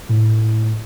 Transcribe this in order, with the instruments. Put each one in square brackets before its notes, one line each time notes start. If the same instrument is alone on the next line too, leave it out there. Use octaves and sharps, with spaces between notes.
[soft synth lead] A2